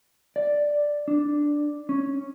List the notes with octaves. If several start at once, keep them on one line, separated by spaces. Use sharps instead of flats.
D5
D4
C#4